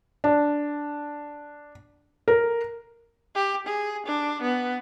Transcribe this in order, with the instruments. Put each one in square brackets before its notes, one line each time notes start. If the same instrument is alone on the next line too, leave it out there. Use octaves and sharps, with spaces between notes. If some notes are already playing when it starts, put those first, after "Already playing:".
[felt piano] D4
A#4
[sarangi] G4
G#4
D4
B3